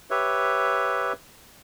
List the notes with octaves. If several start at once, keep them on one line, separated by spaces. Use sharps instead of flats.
G4 B4 C#5 E5